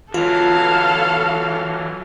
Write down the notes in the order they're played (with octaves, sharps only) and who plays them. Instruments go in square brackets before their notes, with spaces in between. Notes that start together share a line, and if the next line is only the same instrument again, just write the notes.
[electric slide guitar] E3 F#3 [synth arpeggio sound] F4 [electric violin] A4 F5